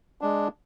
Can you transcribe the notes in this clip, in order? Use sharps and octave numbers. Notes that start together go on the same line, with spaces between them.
G#3 D4